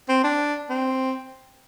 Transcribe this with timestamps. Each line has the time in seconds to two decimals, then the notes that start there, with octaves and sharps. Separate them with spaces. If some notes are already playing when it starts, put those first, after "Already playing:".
0.09 C4
0.24 D4
0.70 C4